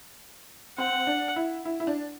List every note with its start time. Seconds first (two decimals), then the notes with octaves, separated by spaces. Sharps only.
0.78 C4 F#5
1.07 D4
1.36 E4
1.65 E4
1.80 E4
1.87 D4